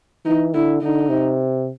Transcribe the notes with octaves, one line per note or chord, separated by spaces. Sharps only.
E3 D#4
D3 E4
D3 D#4
C3